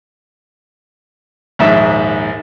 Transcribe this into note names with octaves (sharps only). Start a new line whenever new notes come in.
A#1 D#2 G#2 E5